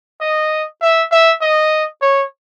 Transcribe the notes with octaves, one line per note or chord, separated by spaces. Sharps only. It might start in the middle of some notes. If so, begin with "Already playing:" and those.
D#5
E5
E5
D#5
C#5